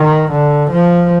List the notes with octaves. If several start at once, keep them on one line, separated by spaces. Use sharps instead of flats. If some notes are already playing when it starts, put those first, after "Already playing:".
Already playing: D#3
D3
F3